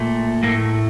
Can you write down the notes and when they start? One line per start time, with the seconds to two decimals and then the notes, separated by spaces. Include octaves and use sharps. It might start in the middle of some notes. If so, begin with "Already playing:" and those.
Already playing: A#2 A3
0.43 A2 A3 A#3